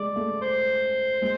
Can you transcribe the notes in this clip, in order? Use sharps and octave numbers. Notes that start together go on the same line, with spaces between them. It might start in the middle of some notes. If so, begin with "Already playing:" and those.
Already playing: G#3 D5
A3
C5
G#3